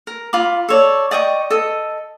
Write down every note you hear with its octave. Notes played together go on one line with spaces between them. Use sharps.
A#4
F4 B5 D6
A4 C#5 D5
D5 D#5 G5 C#6
A4 D#5